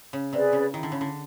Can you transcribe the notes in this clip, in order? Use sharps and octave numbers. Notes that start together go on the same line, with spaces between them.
C#3
C3 G#4 B4 D5
C#3
D#3 E4
D3
C#3
D3